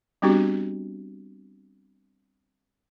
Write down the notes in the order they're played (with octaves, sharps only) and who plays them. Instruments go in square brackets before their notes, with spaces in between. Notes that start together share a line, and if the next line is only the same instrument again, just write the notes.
[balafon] G3 B3 C4 D4 F#4 G4